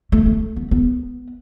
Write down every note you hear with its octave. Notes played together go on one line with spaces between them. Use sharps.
A3
A3
B3
B3